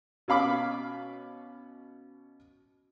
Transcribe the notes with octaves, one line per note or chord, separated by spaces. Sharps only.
B2 C#4 F5 B5 D6